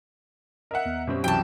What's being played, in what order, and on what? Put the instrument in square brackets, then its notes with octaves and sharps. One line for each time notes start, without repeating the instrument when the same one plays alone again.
[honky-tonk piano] A#4 F#5 [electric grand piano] D#5 E5
[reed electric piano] D#2 B3
[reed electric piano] F#2 C#4 G4 [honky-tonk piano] B2 G3 C4
[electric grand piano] C2 E3 F#3 [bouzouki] G5 A5